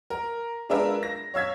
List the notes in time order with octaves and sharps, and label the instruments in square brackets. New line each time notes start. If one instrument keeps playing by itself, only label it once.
[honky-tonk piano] A#4
G#3 D4 F4 A#4 B4 E5
A#6
C#5 F5 E6 G#6 B6